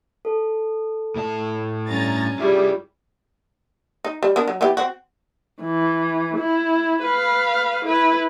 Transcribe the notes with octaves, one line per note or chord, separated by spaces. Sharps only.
A4
A2 A5
G2 C#4 A#5 A6
G3 E4 F4 G#4
D#4
G3
B3 D4 A#4
F#3
E3 B3 G4
C4 F#4
E3
E4
B4 F5
E4 B4